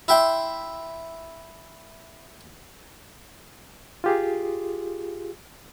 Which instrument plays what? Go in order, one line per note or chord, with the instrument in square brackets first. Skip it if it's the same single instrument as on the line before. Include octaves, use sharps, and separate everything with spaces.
[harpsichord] E4 E5 G5 C6
[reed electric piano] F4 G4 G#4